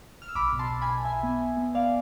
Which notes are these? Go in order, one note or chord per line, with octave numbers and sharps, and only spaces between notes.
F6
E6
B1 B5 D6
B2
A5 C6
B1
G#5 B5
B2
B1 E5 G#5
B3
B3
B3
B3 D5 F5